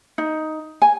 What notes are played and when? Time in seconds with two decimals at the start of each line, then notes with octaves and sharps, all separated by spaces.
0.18 D#4
0.82 G#5